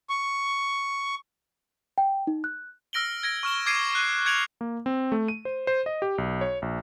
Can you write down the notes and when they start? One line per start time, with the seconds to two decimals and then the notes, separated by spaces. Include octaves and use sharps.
0.10 C#6
1.98 G5
2.27 D#4
2.44 F#6
2.93 E6 F6 A#6 D7 F#7 G7
3.23 G#6 A#6 D7
3.43 C#6 F6 E7 G7
3.66 D6 G#6 C7 D7 D#7
3.95 F#6 D#7
4.26 G#6 C#7 D7 F7 F#7
4.61 A#3
4.86 C4
5.12 A3
5.28 D#7
5.45 C5
5.67 C5
5.86 D#5
6.02 G4
6.18 B1
6.41 C#5
6.62 A#1